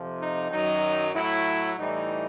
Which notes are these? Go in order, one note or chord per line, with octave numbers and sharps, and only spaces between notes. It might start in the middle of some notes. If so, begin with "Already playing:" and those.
Already playing: F2 C3 F3
D#4
F#2 D#3 F#3 D#4
A2 F#3 E4
A2 E3 G3 D#4